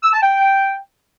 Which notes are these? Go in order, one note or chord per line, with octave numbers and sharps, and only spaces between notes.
E6
A5
G5